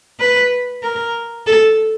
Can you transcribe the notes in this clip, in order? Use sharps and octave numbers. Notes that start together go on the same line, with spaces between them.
B4
A#4
A4